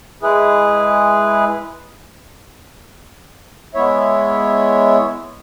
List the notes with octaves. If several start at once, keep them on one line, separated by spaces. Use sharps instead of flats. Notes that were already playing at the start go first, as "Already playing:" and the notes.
G#3 E4 G#4 B4
G#3 B3 E4 C#5 E5